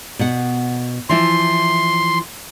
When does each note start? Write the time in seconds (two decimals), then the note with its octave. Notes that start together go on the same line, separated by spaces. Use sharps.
0.19 B2 F#5
1.09 E3 F3 E4 C6